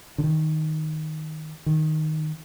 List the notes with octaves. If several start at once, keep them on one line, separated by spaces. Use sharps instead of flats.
D3
D#3
D#3